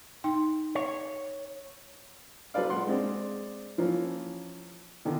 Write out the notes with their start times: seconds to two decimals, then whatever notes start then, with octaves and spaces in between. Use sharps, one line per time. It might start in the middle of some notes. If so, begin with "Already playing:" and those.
0.24 D#4 G5 C6
0.75 C#5
2.54 F#3 A4 B4 C5 D5 F5
2.70 A#2 G#3 F#5 C6
2.87 G#3 C4 D4
3.78 E3 F3 A#3 C#4 F4
5.05 A#2 D3 D#3 B3